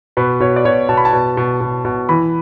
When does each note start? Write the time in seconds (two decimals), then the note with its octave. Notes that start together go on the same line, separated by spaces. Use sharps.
0.17 B2 B4
0.40 B2 C#5
0.56 D5
0.65 B2 C#5
0.89 B2 A5
0.97 B5
1.05 A5
1.13 B2
1.37 B2
1.61 B2
1.85 B2
2.09 E3 B5